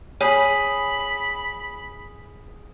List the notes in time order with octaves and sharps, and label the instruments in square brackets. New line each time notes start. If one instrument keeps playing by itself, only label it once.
[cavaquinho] G#4 [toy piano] C#5 [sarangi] B5